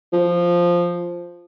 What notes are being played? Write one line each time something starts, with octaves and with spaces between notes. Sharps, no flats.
F3